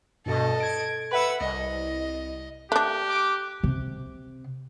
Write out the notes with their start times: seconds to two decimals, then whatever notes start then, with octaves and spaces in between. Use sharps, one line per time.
0.26 G2 B2 A4 D#5
0.60 G#6 D7
1.11 B4 E5 F#5 B5 E6
1.41 C2 D#5
2.72 A3 D4 G4 F#6
3.09 D6
3.63 C3